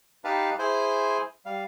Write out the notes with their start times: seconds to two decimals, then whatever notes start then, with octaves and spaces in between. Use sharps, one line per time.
0.24 D#4 G4 B4 F5 A5 B5
0.59 E4 G#4 C5 G#5 G6
1.46 G3 F5